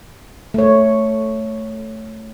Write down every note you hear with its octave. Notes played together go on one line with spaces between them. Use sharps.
A3 C#5